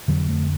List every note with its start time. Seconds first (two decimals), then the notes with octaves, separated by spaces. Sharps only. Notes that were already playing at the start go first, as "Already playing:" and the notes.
0.08 F2 D3 F#3
0.28 A3